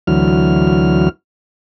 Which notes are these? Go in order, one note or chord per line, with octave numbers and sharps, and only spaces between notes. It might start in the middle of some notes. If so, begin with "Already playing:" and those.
D2 E3 F#3 F6